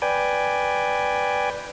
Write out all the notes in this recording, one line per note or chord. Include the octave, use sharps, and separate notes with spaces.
B4 D5 G5 G#5